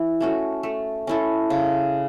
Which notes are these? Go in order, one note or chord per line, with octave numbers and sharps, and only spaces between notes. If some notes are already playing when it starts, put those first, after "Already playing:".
Already playing: E3
A3 C#4 F#4
A3
C#4 E4 A4
C#3